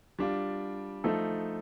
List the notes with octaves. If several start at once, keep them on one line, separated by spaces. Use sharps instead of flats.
G3 D4 F4
F3 A3 D#4 A4